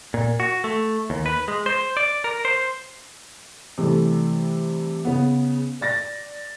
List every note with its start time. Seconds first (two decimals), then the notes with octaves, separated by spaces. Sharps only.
0.14 A#2
0.40 F#4
0.64 A3
1.10 D#2
1.26 B4
1.48 G#3
1.66 C5
1.97 D5
2.24 A#4
2.45 C5
3.78 C3 E3 G3 A3
5.05 C#3 B3
5.81 D5 A6 A#6